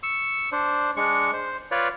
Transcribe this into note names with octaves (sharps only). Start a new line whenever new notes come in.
C#6 E6
D4 C5
G#3 D4 C#6
C5
F4 B4 C#5 D5